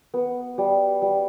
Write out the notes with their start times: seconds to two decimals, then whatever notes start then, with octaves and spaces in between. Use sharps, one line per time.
0.14 B3
0.58 G3
1.02 G3